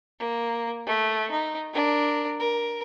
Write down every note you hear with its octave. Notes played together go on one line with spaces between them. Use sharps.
A#3
A3
D#4
D4 A#4
A#4